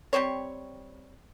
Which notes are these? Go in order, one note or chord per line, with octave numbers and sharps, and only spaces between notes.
G3 C4 C5 C#5